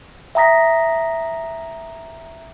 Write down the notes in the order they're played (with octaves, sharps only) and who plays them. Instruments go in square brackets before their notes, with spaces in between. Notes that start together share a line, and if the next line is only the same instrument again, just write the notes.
[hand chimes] E5 G5 A#5 D#6 A#6 B6